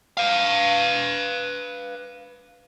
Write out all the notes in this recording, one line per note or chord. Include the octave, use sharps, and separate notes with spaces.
B4 F5